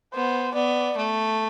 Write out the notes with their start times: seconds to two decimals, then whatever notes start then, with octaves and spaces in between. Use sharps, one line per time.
0.14 B3 C5
0.55 B3 D5
0.97 A3